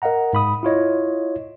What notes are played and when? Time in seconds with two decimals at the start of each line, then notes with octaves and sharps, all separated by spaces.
0.02 A#4 D#5 F5 F#5 A#5
0.33 G#2 B5 D#6
0.63 E4 F4 C#5 D#5